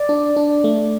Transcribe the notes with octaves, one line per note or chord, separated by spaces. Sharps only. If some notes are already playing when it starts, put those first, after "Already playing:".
Already playing: D5
D4
D4
A3